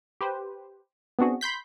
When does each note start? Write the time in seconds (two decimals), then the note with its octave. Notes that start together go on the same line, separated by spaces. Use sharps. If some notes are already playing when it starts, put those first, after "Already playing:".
0.21 G4 B4 C5
1.19 B3 C4 D4 F#4 G#4
1.41 B5 C6 G6 B6